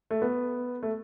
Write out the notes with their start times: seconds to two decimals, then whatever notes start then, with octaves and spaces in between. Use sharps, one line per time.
0.11 A3
0.22 B3
0.83 A3